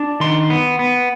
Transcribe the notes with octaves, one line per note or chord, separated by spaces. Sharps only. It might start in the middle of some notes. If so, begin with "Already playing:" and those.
Already playing: D4
D#3 C6
B3
B3